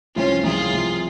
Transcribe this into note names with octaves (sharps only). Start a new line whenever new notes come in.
C2 C3 F3 C#4 F4
C2 C3 F3 F4 G#4
C2 C3 F3